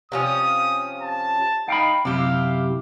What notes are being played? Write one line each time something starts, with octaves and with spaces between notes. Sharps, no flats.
C3 F3 C#4 D#6
A5
D#4 F5 G5 B5
F#2 C3 E4 G4 F5